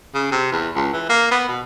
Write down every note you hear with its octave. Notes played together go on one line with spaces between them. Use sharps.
C#3
C3
E2
C#2
E3
A#3
B3
B2